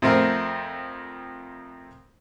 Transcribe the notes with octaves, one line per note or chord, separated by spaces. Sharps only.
F2 A3 C4 A#4 F#5